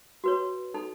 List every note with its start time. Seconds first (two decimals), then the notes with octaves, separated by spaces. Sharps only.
0.24 F#4 B4 C#5
0.74 D#4 A4